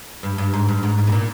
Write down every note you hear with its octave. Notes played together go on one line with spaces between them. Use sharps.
G2
G2
G#2
G2
G#2
G#2
B2
A#2